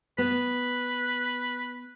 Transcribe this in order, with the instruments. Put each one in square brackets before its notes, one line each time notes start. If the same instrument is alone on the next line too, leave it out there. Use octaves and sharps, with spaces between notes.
[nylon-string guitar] B3 [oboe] B4